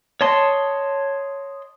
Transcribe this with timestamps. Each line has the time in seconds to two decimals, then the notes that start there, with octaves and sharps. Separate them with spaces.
0.21 C#5 D#5 A5 C6